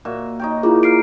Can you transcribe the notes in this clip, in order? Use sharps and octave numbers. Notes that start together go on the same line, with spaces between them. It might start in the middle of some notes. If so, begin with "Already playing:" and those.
A#2 F#4 E5
D#4 C#5 G5
A#3 E4 F4 G#4
F6 C7 D7